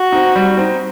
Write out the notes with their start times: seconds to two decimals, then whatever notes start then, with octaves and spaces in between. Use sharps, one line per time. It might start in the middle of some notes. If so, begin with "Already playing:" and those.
Already playing: F#4
0.12 C4 D#4
0.36 G3
0.57 C4 D#4